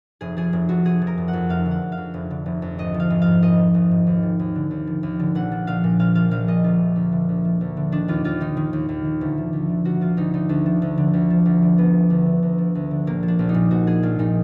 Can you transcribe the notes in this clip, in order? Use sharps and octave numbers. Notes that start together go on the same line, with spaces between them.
F1 G#4
F3 G#4
F1
F2 F#4
F1 G#4
F3
A#4
F1
F#5
F2
F1 F5
D3
F#5
F1
F5
F2
F1
D3
F1
F2
G#1 D#5
F3
F5
G#1
F5
G#2
G#1 D#5
F3
G#1
G#2
D#2
F3
D#2
D3
D#2
F3
D#2
D3
A#1 F#5
F3
A#1 F5
A#2
A#1 F5
F3 F5
A#1 F5
A#2 D#5
D2 F4
F3
D2
D3
D2
F3
D2
D3
D#3 D4
D#2 F4
D#2 F4
D#3 D#4
D#3
D#2
D#2
D#3
D2
F3
D2
D3
D2 F#4
F3 F4
D2 D#4
D3 D#4
D2 D4
F3
D2
D3
D2
F3
D2
D3
D2 B3
F3
D2
D3
D2
F3
D2
D3
A#1 A#3
F3
D4
A#1
D#4
A#2
A#1 F#4
F3 G#4
A#1 F4
A#2 D#4